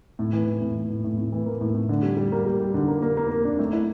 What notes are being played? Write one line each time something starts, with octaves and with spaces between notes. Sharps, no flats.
A2
E3
A2
A2
E3
A2
A2
A2
E3
A#3
A2
A2
D3
G3
G3
A#3
G3
G3
D3
A#3
A#3
A#3
A#3
D4
A3
E4